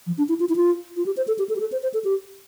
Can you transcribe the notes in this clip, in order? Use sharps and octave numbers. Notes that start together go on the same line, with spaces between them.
F3
D4
E4
F4
E4
F4
F4
G4
C5
A4
G4
A4
G4
A4
C5
C5
A4
G4